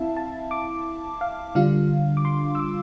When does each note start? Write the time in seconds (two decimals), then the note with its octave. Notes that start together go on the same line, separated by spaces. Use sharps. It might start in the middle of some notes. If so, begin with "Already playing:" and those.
Already playing: C4 E4 E5 F5 A5
0.17 A5
0.51 D6
1.21 F5
1.55 D3 G3 D4 F4 F5
2.17 D6
2.25 C6
2.55 E6
2.59 D6